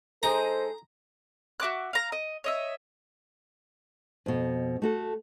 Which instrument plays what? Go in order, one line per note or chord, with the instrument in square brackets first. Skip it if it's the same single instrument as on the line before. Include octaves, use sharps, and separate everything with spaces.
[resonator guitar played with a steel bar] G#3 D#4 G#4 [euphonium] A4 [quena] C5 [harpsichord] A#5
[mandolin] F#4 E5 D6 F#6
F5 A#5
D#5
C#5 D#5 E5
[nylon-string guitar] F2 B2
A3 F#4 A4